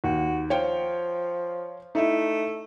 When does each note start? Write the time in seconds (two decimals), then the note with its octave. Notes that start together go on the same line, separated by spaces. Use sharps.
0.04 D#2 F#4
0.50 F3 C#5 F5 G5
1.95 A3 D#4 E4